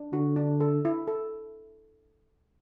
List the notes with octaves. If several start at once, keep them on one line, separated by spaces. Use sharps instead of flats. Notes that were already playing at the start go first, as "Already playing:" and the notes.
Already playing: D4
D3 F#4
D4
A4
E4
A4